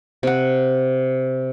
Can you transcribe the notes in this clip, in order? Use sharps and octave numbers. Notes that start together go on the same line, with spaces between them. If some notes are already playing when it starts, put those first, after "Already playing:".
C3 F#5